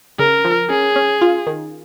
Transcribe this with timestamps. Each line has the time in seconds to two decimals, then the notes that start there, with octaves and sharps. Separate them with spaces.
0.19 C#3 A#4
0.45 F3
0.70 C#4 G#4
0.96 C#4
1.21 F4
1.47 D#3